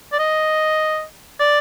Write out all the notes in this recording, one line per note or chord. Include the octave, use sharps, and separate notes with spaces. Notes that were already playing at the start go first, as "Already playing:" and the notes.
D5
D#5
D5